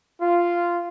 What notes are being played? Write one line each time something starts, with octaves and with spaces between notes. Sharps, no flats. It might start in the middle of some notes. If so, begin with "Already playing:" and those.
F4